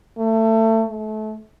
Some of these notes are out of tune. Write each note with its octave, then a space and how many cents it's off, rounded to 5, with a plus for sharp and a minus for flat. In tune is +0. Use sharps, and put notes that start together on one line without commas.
A3 +25
A3 -30